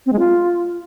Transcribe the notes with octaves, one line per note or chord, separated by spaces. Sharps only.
C4
G#3
F4